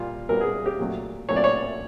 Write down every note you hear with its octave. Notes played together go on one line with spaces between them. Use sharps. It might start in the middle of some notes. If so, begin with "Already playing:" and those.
Already playing: A#2 G3 F4
A#2 G3 B3 A#4
G#4
G4
A#2 F#3 A3
A#2 F#3 A3 C#5
D5
C#5